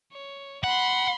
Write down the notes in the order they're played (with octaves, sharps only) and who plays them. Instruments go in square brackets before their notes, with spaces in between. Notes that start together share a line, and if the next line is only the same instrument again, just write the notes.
[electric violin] C#5
[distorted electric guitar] F#5 [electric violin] B5 C6